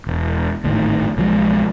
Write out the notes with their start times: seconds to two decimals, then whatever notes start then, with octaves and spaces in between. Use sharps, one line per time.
0.07 E1
0.63 G#1 D2 A2 D#3
1.17 B1 F3 G#3